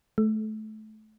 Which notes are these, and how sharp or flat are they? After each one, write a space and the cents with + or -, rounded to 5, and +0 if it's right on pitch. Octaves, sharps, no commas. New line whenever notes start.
A3 -25